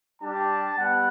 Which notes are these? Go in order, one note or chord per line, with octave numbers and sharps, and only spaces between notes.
G3 D4 G4 A5
G3 B3 F#5